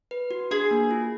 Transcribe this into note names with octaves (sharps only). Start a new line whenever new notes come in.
B4
F#4
D4 G#4
A#3
F4